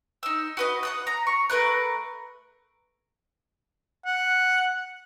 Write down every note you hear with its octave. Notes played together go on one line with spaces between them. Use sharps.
D#4 E6
F#4 B4 D#5
F#5 D#6 F#6
A#5
C#6
A3 A#4 B4 F#6
F#5